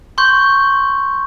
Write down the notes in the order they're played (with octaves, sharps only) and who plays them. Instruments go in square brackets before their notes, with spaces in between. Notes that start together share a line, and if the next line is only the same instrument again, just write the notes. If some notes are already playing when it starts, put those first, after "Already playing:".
[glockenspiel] C6 C#6 G6